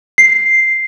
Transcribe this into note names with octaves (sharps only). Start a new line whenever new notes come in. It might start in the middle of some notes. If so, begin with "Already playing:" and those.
C7